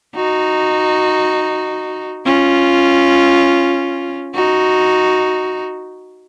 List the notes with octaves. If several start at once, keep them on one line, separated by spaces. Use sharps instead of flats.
D#4 F#4
C#4 F4
D#4 F#4